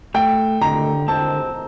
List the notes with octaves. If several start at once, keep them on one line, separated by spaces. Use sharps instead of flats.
A3 G5
D3 A#5
C4 A5